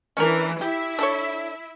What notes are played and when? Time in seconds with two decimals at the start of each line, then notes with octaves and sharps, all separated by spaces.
0.17 E3 C#4 D4 A#4
0.61 E4 G4 E5
0.99 D4 A4 C#5